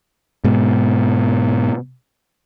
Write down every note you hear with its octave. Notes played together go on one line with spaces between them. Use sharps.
G#2 B2